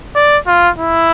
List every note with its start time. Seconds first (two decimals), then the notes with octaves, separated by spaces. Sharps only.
0.16 D5
0.47 F4
0.79 E4